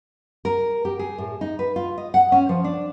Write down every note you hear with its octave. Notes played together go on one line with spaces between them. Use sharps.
A#4
G4
G#4
A2
D#4
B4
F4
D#5
F#5
C#4
F3
D4